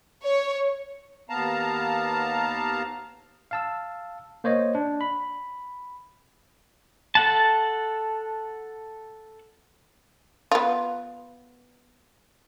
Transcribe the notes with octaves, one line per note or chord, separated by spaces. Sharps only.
C#5
D#2 B3 F5 A5 A#5
F5 A5 E6
A#3 C5 C#5 D#5
D4
B5
A4 F#5 A5
B3 F4